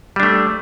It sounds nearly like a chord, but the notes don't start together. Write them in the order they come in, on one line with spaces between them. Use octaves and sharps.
G3 D4 A3